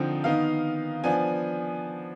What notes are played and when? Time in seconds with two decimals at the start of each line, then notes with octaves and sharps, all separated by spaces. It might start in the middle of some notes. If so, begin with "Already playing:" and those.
Already playing: D3 F3 C4 D#4 G5
0.24 D#3 B3 D#4 F5
1.04 F3 B3 D4 G#5